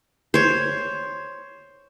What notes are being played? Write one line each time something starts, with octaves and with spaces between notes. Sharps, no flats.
C5 C#5